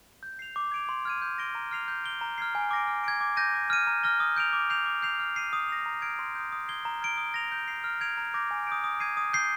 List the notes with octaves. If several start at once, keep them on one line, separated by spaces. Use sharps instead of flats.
G6
C7 F7
D6
G#6 D7 F7
C6
F6 G#6 D#7
G6
A#6 D7 G7
A#5
F6 C7 F7
G6
D7 G7
A#5
F6 G#6 C7
G#5
D6 F6 A#6 D7
F6
G#6 D7
D6
G6 A#6 D#7
D6
F6 G#6 D#7
A#5
F6 A#6 D#7 G7
D#6
G6 D7 F7
D6
G6 C7 F7
D6
G6 C7 F7
F6
C7 D#7
D#6
A#6 F7
A#5
F6 G#6 D7
C6
D#6 G6
D#6
G#6 C7 G7
A#5
F6 G#6 D7 G7
D#6
A#6 F7
G6
C7 F7
F6
G#6 D7 F7
A#5
D6 G6 A#6
G#5
D#6 G6 D7
D#6
G#6 C7 D#7
D#6
G6 C7 G7